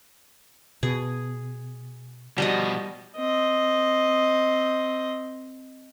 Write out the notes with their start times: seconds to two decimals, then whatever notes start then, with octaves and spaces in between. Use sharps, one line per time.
0.83 B2 G#4
2.38 B2 F3 G3 F#4 D#5
3.17 C4 D#5